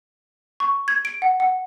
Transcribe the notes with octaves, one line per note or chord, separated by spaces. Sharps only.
C#6
G#6
D7
F#5
F#5